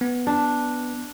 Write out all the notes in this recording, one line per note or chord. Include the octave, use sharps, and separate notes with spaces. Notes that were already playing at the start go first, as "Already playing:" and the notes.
B3
D4